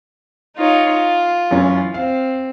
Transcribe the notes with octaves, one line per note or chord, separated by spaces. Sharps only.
D#4 F4 C#5
F4
F#2 E3 C#4
C4 F5